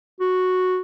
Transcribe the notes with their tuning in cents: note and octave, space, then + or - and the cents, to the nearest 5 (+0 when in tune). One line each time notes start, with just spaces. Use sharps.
F#4 -5